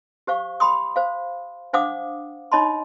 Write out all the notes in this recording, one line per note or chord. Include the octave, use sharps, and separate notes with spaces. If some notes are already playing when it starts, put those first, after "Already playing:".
G4 C5 F5 C#6
G5 B5 C6 D#6
C5 F5
D4 C5 F5 F#5 D6 D#6
D#4 C#5 D#5 A5 B5 C6